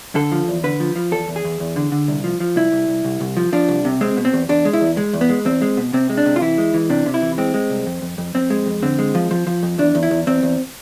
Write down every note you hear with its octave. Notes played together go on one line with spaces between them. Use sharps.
D3 A4
F3
E2
D3 B4
F3
F3
E2 A4
E2
G#4
E2
E2
D3
D3
C2
F3
F3
C2 E4
C2
C2
C2
C2
F3
F3 D4
C2
C3
G#3 C4
B2
C4
E2
E2 D4
G#3
E4
E2
G#3
E2
B3
G#3
E2 C4
G#3
B2
C3 C4
G#3
D4
C3
F4
E3 E4
G#3
E3
C3 D4
C3
E4
E3
G#3 C4
G#3
C2
F2
F2
F2
F2 C4
G#3
F2
D3 C4
G#3
F3
F3
F3
F2
E2 D4
E2
E4
E2
E2 C4
E2